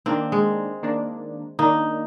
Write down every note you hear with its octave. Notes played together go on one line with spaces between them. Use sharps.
D#3 A#3 C4 D4
G#3
D#3 A#3 D4
D#3 A#3 D4 D#4